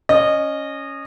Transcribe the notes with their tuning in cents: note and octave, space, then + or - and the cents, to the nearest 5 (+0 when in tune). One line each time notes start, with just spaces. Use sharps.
C#4 +0 D#5 -20